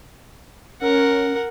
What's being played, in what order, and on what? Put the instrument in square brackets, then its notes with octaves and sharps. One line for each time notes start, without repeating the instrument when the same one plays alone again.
[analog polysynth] C#4 [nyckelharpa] A#4 F#5